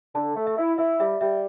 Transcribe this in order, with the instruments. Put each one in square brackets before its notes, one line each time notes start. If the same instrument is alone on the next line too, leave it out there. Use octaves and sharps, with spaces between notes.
[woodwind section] D3 [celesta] A5
[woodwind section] A3
[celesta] E5
[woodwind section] E4
[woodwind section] E4 [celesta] E5
[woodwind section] G3 [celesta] E5
[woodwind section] G3 [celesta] E5